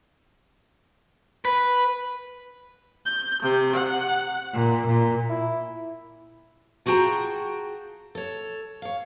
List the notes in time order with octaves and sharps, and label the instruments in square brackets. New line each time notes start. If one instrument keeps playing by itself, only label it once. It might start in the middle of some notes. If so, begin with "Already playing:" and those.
[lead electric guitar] B4
[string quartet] G6
C3
F#5
A#2
A#2
[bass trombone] E4
[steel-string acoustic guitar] F4 F#4 G#4 G5 A5 A#5
A4 C#5
C#5 F5